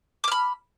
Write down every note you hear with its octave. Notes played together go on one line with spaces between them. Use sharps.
B5 D6 F6